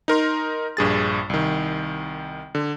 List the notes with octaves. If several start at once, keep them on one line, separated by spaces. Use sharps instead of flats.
D#4 A#4 C6
A#1 G2 G#4 A6
C2 D#3
D3